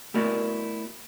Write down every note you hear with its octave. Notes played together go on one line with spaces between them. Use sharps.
A3 B3 E4 F#4 A#4 D5